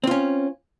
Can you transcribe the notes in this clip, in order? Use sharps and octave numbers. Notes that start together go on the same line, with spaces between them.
C4 C#4 F4